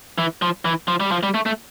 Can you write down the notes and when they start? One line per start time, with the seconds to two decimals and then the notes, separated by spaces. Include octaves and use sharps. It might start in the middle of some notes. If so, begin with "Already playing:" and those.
0.18 E3
0.42 F3
0.65 E3
0.88 F3
1.00 G3
1.12 F3
1.23 G3
1.34 A3
1.46 A3